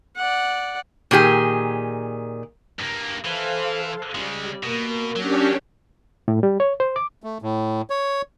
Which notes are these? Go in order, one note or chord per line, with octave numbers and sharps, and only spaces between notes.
D5 F#5
A#2 D#3 G4 G#4
G2 A#3
E3 A4 C5 F5
C#3 G3 G#3
B2 A#3
F#3 C#4 D4 G4
A2
G3
C#5
C5
D6
A3
A2
C#5